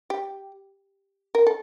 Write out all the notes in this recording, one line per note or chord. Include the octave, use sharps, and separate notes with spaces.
G4
A#4
A4